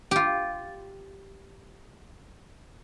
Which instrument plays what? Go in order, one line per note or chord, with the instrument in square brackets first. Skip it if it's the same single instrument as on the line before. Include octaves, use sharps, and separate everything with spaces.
[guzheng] F4 G4